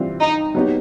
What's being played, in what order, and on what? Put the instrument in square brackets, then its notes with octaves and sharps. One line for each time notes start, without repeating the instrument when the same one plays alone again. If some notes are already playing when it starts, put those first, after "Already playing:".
Already playing: [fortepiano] E3 G3 C4 F4
[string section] D#4
[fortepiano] F#3 B3 D#4 G4